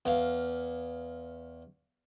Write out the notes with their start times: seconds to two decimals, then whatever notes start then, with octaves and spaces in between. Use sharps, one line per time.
0.05 E2 F5